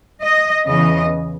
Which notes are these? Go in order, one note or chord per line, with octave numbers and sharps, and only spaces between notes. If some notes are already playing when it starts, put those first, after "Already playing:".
D#5
E2 C#3 E3 D#5